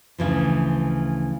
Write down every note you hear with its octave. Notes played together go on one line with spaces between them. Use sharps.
D2 C#3 E3 F3